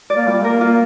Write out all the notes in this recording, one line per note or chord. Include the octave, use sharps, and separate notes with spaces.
D5
A#3
G3 F4
A#3 A#4
A#3 F4